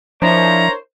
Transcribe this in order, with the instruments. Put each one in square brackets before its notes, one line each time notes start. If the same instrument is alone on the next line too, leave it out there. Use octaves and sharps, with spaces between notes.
[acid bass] F3 [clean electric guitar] D4 E4 [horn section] A#4 C5 C#5 [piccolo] A#5